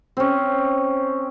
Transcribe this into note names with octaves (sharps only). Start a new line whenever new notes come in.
C4 C#4